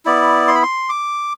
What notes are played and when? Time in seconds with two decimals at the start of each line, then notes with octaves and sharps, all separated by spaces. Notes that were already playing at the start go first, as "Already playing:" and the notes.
0.05 B3 E4 D5
0.48 C6
0.55 B5
0.63 C6
0.89 D6